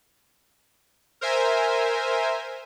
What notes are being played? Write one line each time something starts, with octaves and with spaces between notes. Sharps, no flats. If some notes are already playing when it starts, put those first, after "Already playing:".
A#4 C5 E5 G#5